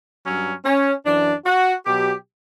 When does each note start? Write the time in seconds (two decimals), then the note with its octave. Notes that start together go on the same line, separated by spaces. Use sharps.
0.25 G2 F#3 C#4
0.65 C#4
1.06 F#2 E3 D4
1.46 F#4
1.86 B2 F#3 G4